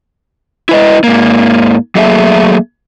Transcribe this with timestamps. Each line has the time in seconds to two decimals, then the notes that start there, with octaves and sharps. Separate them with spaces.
0.69 E4 B4 D#5
1.04 G#2 A#3
1.95 F#3 A3 A#3 G#4 E5